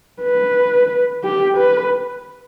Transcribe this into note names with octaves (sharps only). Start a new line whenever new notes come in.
B4
G4
B4